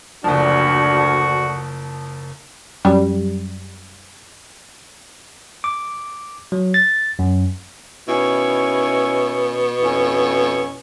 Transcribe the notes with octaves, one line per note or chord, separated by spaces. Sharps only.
F#1 D2 F3 D4 F#4
F#2 G3
D6
F#3
A6
F#2
B2 D#3 C#4 E4
F2 C#4 E4